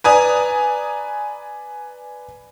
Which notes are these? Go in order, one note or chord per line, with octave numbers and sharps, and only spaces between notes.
B4 D5 G#5 A#5 D#6